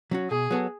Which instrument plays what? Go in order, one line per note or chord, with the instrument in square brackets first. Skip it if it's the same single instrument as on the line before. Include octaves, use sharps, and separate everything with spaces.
[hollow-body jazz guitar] F#3 C#4 F#4
[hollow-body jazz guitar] B2 [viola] G#4
[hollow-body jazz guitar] F#3 B3 F#4 A4